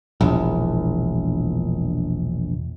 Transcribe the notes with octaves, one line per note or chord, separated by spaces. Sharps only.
E1 A#1